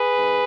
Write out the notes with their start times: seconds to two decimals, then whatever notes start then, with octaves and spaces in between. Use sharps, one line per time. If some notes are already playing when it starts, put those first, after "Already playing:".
Already playing: G#4 B4
0.16 G#2